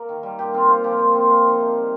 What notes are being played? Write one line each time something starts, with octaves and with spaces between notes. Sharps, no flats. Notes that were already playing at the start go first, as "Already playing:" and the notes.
Already playing: A#3 A#4
D#3
G3
A#2 G4
C4 F4
A#2 F4
F3 G4
A#2
C4 F4
A#2 F4
F3 D#4
C3
G3